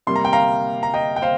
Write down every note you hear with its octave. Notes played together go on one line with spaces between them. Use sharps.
C3 G3 A#3 C6
A#5
G5
F5 A#5
A#5
D#5 G5
G5
C5 F5